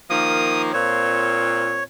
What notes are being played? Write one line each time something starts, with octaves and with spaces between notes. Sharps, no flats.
D#3 F3 A#3 D#6
A#2 C4 C#5